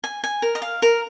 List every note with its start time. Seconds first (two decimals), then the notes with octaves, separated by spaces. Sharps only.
0.04 G#5
0.24 G#5
0.42 A#4
0.55 D#5
0.62 F5
0.82 A#4